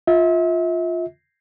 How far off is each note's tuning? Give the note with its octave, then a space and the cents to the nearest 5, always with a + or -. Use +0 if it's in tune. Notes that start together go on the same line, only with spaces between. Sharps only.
F4 +10 E5 -35